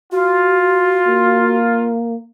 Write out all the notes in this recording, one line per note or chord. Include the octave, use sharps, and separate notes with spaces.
F4 F#4
A#3